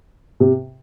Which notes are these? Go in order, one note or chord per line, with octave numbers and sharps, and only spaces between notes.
C3